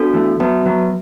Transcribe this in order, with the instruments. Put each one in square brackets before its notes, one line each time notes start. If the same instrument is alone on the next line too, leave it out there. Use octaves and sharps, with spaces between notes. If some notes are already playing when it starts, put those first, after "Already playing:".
Already playing: [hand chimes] B3 D4 F#4 A4
[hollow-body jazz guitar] E3 A3
[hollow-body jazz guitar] F#3 B3 [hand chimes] F#4 B4 E5 A5
[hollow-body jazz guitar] F#3 B3